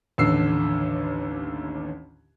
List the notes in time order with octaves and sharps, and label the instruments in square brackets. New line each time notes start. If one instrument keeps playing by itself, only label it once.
[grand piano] A1 D#2 D3 E6 C7